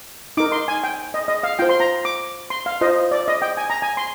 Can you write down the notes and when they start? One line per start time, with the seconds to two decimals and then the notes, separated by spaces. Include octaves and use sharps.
0.37 D#4 A#4 D6
0.52 C6
0.68 G#5
0.84 G5
1.14 D#5
1.28 D#5
1.43 F5
1.59 F4 C5 G5
1.69 C6
1.80 A#5
2.05 D6
2.50 C6
2.66 F5
2.81 F4 C5 D#5
3.11 D5
3.28 D#5
3.42 G5
3.57 G#5
3.70 A#5
3.82 G#5
3.97 C6